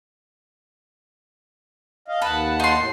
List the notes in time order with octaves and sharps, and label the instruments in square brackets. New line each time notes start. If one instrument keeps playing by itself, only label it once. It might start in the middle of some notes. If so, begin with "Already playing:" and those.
[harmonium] D#5 F5
[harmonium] D#2 F#5 A5 [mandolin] B4
[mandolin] D#4 C6
[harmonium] A2